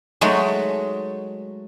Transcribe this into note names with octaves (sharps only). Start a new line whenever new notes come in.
F#3 G#3 A3 D#4